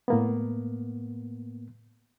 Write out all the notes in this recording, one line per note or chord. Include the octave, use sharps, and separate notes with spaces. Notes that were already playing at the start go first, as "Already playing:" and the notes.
A2 A#3 B3